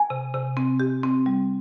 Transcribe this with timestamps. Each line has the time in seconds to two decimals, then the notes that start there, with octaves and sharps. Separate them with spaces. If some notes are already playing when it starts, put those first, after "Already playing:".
Already playing: G#5
0.10 C3
0.34 C3
0.57 C4
0.80 G4
1.03 C4
1.26 G3